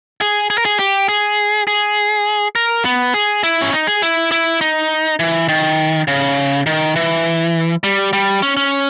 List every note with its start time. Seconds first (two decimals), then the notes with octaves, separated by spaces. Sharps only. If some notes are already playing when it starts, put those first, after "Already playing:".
0.21 G#4
0.50 G#4
0.58 A#4
0.65 G#4
0.79 G4
1.09 G#4
1.67 G#4
2.55 A#4
2.85 B3
3.14 G#4
3.43 E4
3.62 C#4
3.73 D#4
3.87 G#4
4.02 E4
4.31 E4
4.61 D#4
5.19 E3
5.49 D#3
6.08 C#3
6.66 D#3
6.96 E3
7.84 G3
8.13 G3
8.42 C#4
8.57 C#4